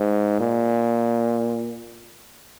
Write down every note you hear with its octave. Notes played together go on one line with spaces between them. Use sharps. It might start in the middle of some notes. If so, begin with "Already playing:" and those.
Already playing: G#2
A#2